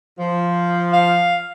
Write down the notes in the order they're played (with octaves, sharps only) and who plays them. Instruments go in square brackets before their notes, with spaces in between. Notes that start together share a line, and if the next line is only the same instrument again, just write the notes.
[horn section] F3
[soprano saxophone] F5